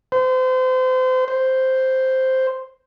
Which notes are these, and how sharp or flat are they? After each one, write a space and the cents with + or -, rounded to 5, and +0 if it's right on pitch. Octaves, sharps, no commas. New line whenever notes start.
C5 -30
C5 +0